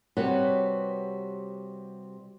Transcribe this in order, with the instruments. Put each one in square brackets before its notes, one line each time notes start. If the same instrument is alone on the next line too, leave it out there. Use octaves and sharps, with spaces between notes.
[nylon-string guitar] C3 G3 F#4 B4 C#5 F#5